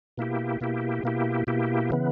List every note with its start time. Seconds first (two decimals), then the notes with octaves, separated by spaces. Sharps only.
0.18 B2 A#3 E4 G4
0.61 B2 A#3 E4 G4
1.04 B2 A#3 E4 G4
1.47 B2 A#3 E4 G4
1.90 C#3 E3 B3